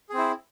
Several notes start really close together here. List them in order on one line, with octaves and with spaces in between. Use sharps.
G#4 C4 E4